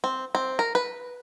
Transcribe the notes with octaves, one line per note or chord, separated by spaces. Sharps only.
C4
C4
A#4
B4